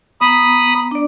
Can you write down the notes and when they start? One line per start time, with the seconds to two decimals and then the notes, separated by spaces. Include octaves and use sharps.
0.21 B3 A#5 B5 D#6
0.91 D4 D5